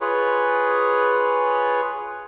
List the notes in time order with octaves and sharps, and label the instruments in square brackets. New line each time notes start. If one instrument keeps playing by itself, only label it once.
[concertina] F4 G#4 B4 C#5